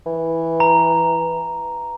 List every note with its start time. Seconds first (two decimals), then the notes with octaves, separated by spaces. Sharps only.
0.06 E3
0.60 A#5